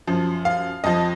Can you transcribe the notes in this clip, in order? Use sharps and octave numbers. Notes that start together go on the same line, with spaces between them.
F#2 F3
F5
F2 F3 D#5